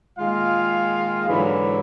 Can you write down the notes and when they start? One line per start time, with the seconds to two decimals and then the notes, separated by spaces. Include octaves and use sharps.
0.19 A#2 D#3 G#3 F4 F5
1.28 G#2 D3 E3 F#3 B5